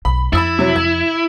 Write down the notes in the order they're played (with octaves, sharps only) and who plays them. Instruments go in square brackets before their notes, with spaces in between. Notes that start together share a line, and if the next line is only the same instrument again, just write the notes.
[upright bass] B1 [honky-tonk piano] B5
[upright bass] F2 [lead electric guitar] E4 [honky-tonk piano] B5 E6 A6
[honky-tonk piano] C3 F#3
G#6